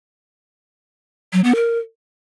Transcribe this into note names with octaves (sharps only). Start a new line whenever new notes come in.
F#3
B3
A#4